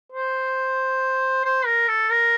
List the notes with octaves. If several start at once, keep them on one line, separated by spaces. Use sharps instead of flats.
C5
C5
A#4
A4
A#4